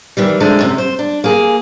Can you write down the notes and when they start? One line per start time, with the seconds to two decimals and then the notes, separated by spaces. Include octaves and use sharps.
0.17 D#3 E3 G3
0.40 D3 F3 G#3 A3 D4
0.59 F#2 C3
0.78 C5
0.99 D4
1.24 A#3 G#4